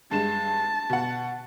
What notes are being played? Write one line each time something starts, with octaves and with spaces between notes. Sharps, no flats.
G2 G#3 A5 E7
B2 F#5